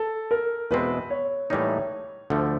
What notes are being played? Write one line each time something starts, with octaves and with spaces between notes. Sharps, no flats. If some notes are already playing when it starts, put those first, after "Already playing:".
Already playing: A4
A#4
E2 B2 G#3 C4 B4
C#5
A2 E3 G3 A#3 D#4 C#5
D2 D3 F3 A3